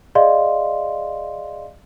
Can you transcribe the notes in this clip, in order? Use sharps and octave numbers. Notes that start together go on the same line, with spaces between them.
G#4 D5 D#5 F5 C6